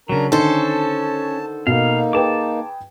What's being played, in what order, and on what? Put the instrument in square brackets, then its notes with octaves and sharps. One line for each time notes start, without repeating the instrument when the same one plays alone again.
[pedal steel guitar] C#3 F#3 [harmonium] D4 A#4 A#5
[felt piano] D3 D#3 [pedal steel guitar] C#4 [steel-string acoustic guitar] A4 C5 [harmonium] A5
[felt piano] B2 [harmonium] A#3 D#4 [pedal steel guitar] F5
[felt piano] G#4 B4 G5 [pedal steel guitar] A5 D6